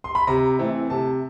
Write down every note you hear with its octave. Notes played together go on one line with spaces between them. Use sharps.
C6
B5
C3 A#5
E3 A3 C4
C3 A5